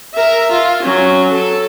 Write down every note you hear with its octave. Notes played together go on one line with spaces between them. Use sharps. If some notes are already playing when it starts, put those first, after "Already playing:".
A#4 E5
F4
F#3 C#4
A4